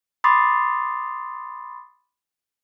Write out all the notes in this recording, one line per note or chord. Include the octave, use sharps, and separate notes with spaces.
B5 C6 D6 D#6 A6 C7